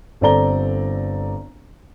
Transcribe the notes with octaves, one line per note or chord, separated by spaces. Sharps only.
G1 C4 A4 D5 A#5 G7